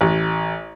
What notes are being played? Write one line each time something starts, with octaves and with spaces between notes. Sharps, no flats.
A1